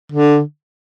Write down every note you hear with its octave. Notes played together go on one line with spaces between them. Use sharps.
D3